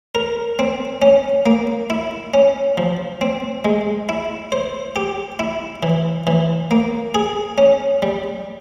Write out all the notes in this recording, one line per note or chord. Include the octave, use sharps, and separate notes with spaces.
A#4
C4
C#4
A#3
E4
C#4
F3
C4
G#3
E4
C5
G4
E4
E3
E3
A#3
G#4
C#4
G3